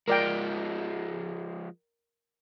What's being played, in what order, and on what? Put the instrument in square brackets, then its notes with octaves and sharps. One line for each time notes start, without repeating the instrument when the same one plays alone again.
[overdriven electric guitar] F3 G#3 [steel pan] A#4 D5 G5